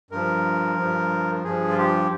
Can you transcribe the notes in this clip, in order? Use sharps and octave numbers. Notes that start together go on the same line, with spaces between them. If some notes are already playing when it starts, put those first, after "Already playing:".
G2 F3 A#4
G2 F3
G2 F3 G#4
F4
G4